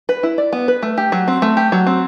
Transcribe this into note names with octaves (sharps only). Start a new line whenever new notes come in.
B4
E4
D5
B3
B4
A3
G4
F#3
C4
A3
G4
F#3
C4